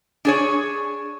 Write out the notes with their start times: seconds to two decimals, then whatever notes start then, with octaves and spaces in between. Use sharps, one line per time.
0.25 D4 G#4 C#5